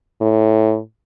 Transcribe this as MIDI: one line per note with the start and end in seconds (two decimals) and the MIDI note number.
0.21 0.78 45